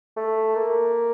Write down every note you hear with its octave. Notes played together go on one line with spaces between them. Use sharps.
A3
A#3